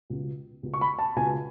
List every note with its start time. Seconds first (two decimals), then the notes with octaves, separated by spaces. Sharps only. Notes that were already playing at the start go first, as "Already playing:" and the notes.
0.10 C#2 B2
0.63 C#2 B2
0.74 C#6
0.81 B5
0.99 A5
1.16 C#2 B2 G#5